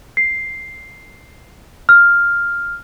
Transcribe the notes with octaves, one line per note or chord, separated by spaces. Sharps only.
C7
F6